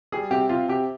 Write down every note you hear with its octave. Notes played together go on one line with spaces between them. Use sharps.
G3 G#4
C3 G4
C3 F4
C3 G4